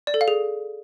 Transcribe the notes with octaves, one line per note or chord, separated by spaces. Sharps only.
D5
A4
F5
G#4